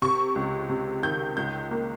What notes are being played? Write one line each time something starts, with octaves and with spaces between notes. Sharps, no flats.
C3 C#6
C#2
C3
D#3 G6
C#2 G6
A#3